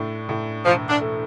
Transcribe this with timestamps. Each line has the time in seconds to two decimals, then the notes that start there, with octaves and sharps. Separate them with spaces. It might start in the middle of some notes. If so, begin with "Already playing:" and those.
Already playing: A2 D4
0.29 A2
0.65 E1 F3
0.89 D4
1.01 A3